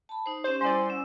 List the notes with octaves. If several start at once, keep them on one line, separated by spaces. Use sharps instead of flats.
A5 B5
D#4 C5
C#4 G4 C5
G3 E4 C5 D5 F#5 G#5 C6
C#4 E6